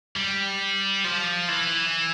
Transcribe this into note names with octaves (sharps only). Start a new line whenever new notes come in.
G3
F3
E3